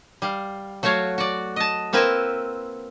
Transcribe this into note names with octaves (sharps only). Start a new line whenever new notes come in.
G3 F5
F#3 A3 F#4 C#5 F5
F#4 D5
D#5 A5
A#3 C4 E4 A#4 B4